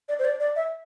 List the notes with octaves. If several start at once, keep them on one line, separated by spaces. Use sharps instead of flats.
D5
C5
D5
D5
E5